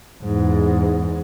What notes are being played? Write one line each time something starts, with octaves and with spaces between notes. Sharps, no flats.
E2 G#2